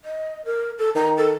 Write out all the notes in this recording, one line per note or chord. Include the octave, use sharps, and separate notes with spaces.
D#5
A#4
A4
D#3 A#5
A4